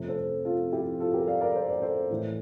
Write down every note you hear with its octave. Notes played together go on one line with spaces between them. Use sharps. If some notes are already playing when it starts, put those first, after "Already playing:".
Already playing: F2 C3 F3 A3
A4 C5
F4 A4
E4 G4
F4 A4
G4 A#4
D5 F5
A#4 D5
C5
D5
A4 C5
A2 E3 A3